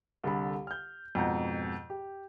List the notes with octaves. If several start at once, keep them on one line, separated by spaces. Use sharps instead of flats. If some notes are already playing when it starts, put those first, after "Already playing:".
C2 D3 A4 B5
F6 G6
F2 G#2 B2 F#5 A#5 G6
G4